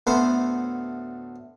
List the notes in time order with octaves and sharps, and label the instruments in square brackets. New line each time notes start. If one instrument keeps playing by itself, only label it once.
[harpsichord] D2 A2 B3 B4 C5